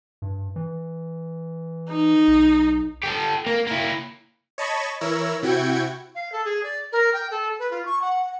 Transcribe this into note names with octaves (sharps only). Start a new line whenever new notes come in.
G2
E3
D#4
B1
G4 A4
A#3
A#3 E4
C#5 D#5 A5 B5 C#6
E3 E4 A#4 C#5 E6
C3 E4 F#4 G5 G#6 C#7
F5
A4
G#4
D5
A#4
G5
A4
B4
F4
C#6
F#5
F#5